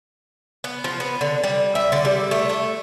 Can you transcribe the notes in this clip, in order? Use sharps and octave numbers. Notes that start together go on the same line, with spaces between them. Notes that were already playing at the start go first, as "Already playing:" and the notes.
B3
F3
B3
D3
G3
E5
D3
G3
A3
A3